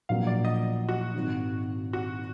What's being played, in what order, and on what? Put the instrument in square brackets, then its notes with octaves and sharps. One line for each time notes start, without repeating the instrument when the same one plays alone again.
[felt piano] A#1 A#2 F#3 B3 [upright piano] F5
[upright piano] D5
D#5
F#4
[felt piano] G#1 G#2 D#3
[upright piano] F#4